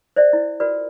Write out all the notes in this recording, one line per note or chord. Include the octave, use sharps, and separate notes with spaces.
C5 D5 E5
E4
F4 F#4 A#4 B4 D5